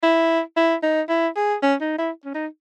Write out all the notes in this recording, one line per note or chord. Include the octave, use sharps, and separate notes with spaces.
E4
E4
D#4
E4
G#4
C#4
D#4
E4
C#4
D#4